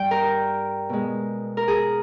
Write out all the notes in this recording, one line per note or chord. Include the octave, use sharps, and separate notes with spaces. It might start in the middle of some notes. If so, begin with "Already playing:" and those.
Already playing: G2 G3 G5
A#4
B2 G#3
A#4
G#4